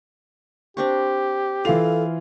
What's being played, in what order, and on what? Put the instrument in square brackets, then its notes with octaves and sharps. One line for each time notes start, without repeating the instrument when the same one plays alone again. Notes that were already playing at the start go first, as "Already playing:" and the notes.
[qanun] C4 D4 C#6 [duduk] G4
[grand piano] E3 F5 F7 [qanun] F4 [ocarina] A4